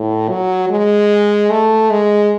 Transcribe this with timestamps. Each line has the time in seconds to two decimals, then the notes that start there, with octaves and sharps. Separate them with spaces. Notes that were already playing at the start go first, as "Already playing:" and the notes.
Already playing: A2
0.28 F#3
0.69 G#3
1.51 A3
1.91 G#3